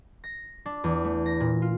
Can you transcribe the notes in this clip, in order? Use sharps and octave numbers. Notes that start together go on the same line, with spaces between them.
A#6
D4
E2
A3
A#6
A#2
F4